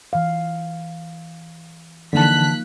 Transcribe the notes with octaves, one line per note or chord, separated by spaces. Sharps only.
E3 F5
D3 E3 F3 A#3 D#4 A5 F#6 B6